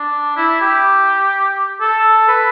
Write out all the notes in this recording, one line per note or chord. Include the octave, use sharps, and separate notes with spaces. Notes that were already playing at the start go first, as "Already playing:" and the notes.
Already playing: D4
E4
G4
A4
B4